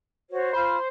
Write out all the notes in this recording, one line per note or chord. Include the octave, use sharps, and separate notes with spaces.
F#4 C5 C#5
F4 C5 B5